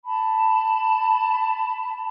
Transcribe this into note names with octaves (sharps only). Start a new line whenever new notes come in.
A5 B5